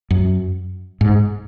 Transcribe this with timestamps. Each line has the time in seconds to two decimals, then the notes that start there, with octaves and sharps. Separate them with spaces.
0.10 F#2
1.01 G#2